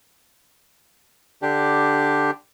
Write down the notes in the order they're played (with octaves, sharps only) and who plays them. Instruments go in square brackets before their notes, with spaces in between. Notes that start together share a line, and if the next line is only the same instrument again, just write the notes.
[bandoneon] D3 D4 G4